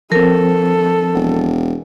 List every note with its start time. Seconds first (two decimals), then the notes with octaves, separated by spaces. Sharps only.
0.12 F3 C4 A4 A#4
1.15 E1